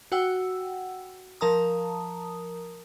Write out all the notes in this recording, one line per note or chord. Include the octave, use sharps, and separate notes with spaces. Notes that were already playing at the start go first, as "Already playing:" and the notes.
F#4 F#5 G5 E6
F3 A#4 A5 A#5 D#6